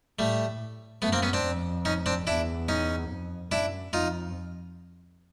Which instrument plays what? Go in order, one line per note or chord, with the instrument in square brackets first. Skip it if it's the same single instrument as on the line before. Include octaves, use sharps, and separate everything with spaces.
[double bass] A2 [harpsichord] G3 A3
[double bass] F#2 [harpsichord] A3 B3
[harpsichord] A#3 C4
B3 C#4
C4 D4
[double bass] F2
[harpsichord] C#4 D#4
C4 D4
[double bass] E2 [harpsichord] D4 E4
[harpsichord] C#4 D#4
[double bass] F2
[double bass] F#2 [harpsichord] D4 E4
[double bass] F2 [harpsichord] D#4 F4